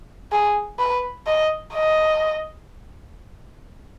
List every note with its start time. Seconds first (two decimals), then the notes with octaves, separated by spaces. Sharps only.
0.32 G#4
0.79 B4
1.26 D#5
1.73 D#5